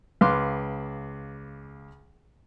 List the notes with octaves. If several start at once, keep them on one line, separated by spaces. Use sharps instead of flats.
C#2 B4 F5 C6 D6